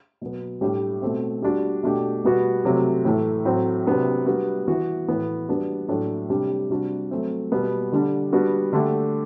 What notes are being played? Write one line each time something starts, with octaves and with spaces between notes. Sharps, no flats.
B2 F#3 B3
A2 G3 D4 G4
B2 A3 C4
G3 D4 F#4
B2 A3 D4 G4
B2 G3 B3 F#4
C3 F#3 A3
A2 E3 A3
A2 F#3 C4
C3 F#3 B3 D4
G3 B3 D4 F#4
E3 B3 F#4
A2 E3 B3
G3 B3 D4 F#4
A2 F#3 A3 D4
C3 G3 D4 G4
C3 G3 D4 F#4
F#3 A3 C4
B2 G3 B3
D3 G3 D4
G3 B3 D4 F#4
D3 A3 D4 G4